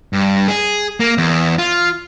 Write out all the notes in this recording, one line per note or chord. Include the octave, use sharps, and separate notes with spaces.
G2
G#4
A#3
E2
F4